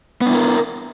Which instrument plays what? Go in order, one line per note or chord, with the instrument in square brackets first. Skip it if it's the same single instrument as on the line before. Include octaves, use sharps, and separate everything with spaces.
[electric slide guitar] B3
D4
E4
A#4